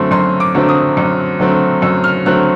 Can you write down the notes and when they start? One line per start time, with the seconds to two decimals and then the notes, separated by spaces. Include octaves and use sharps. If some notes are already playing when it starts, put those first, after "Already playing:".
Already playing: F#2 D3 F#3 A3 C4 C6
0.11 F#2 C6
0.40 D6
0.55 D3 F#3 A3 C4
0.69 D#6
0.97 F#2
1.39 D3 F#3 A3 C4
1.82 F#2 E6
2.04 F6
2.25 D3 F#3 A3 C4 F#6